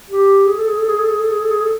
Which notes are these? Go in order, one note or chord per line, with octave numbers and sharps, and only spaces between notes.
G4
G#4
A4
G#4
A4
G#4
A4
G#4
A4
G#4
A4
G#4
A4